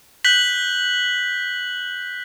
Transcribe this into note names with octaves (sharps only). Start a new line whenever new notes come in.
F#6 G6 B6 F#7